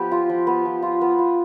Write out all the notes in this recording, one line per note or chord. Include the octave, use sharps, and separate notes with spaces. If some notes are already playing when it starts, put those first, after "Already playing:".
Already playing: F3 B3 G4
F4
F3
B3
F3
F4
B3
F4